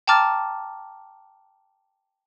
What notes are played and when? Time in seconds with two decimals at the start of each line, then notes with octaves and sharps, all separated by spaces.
0.07 G5 A5 A#5 D6 F6 A6